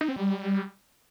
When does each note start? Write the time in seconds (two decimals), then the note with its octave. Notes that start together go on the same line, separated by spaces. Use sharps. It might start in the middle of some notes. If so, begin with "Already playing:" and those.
0.01 D#4
0.08 C4
0.16 G3